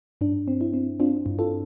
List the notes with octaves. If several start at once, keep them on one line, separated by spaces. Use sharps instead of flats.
G2 D4
C4
E4
C4
C4 D4 F4
G2
F4 A4